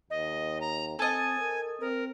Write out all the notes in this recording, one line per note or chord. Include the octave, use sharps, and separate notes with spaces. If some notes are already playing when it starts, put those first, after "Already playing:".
D#2 D#5
A#5
C4 A4 D#5 G#5
A#4
C4 A#4